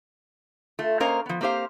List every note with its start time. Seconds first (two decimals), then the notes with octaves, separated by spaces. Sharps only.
0.79 A3 F4
1.00 A#3 C#4 A#4 C5 D#5 F5
1.26 F3 B3
1.41 A#3 C4 G4 C5 F5